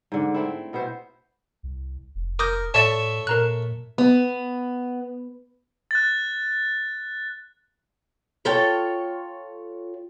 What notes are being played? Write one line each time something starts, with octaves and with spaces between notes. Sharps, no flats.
G#2 D3
A3 C4 E4
B2 B3 E4 C5
C2
F1
A#4 D6 D#6 G6
A2 A4 C#5 D5 E5 A5
A#2 A#4 A#5 F#6
B3
F#6 A6
F4 A4 C#5 G5